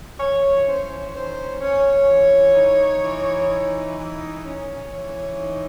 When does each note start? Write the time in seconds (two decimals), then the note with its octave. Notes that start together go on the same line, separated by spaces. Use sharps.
0.19 E3 C#5
0.66 C#4 C5
1.13 D#3 C5
1.61 C#4 C#5
2.09 E3
2.56 D#4
3.03 E3
3.50 D#4
3.98 E3
4.45 C#4
4.92 E3 C#5
5.39 D#4